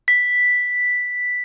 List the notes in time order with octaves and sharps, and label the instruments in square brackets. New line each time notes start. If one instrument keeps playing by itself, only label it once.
[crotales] B6